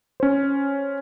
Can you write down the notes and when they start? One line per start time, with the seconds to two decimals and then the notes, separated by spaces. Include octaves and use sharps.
0.20 C#4 C5